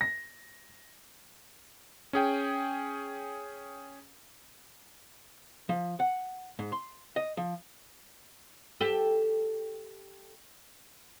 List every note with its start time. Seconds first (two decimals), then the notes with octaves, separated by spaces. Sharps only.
0.01 A#6
2.13 C#4 G#4 G5
5.69 F3
6.00 F#5
6.59 G#2
6.72 C6
7.16 D#5
7.37 F3
8.81 G4 A4